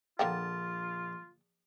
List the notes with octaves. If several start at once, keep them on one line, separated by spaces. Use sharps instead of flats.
A#1 D3 A#3 F4 G5 A5